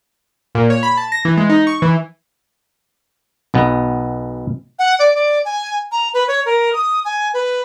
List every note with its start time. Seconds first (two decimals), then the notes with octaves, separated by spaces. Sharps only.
0.55 A#2
0.70 C#5
0.83 B5
0.97 A5
1.12 A#6
1.25 E3
1.37 G#3
1.49 D#4
1.67 C#6
1.82 E3
3.54 B1 B2 B3
4.79 F#5
4.99 D5
5.15 D5
5.45 G#5
5.92 A#5
6.14 B4
6.28 C#5
6.46 A#4
6.73 D#6
7.05 G#5
7.34 B4